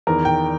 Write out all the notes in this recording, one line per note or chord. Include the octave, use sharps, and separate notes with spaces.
E2 D#3 A#4
G5